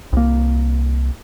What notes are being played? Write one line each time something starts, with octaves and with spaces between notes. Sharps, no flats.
C2 A#3